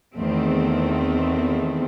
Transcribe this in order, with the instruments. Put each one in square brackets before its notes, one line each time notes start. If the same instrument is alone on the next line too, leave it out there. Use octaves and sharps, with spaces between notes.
[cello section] E2 D#3 A3 C4